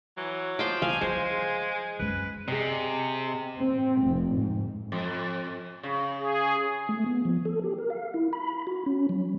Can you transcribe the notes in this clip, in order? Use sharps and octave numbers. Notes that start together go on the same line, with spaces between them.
E3 F#3
F3 G5 C6 D6
E3 F5 G#5
F3 G#3 E4 G#4 C5
F#2 G#3 B4
C3 G#4 D#5
C4
F1
G#2
F2
C#3
G#4
A3
B3
F3
A4
G4
A#4
F5
E4
B5
F#4
C#4
F#3